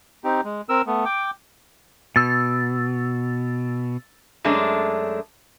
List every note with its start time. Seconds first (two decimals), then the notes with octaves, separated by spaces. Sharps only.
0.24 C4 D#4 G4
0.44 G#3
0.69 C4 A#4 E6
0.87 A3 B3
1.05 G5 D6
2.16 B2 E6 A6
4.44 F#2 G#3 A3 C#4 D4